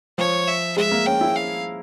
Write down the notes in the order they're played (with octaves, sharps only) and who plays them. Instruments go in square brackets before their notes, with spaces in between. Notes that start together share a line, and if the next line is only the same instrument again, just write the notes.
[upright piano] F3 [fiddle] C#5
[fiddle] E5
[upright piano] G#3 [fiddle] E5
[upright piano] A#3
[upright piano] C#4 [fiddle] G5
[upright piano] E4
[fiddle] F5